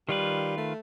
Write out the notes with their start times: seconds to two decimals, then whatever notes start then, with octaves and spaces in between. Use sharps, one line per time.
0.09 D#3 G3 F4 B4
0.57 A3